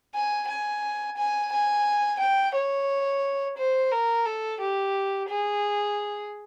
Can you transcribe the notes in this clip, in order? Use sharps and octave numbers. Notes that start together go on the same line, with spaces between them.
G#5
G#5
G#5
G#5
G5
C#5
C5
A#4
A4
G4
G#4